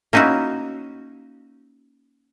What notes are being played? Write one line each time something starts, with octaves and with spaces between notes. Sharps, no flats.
A#3 C#4 D#4 E4 F#4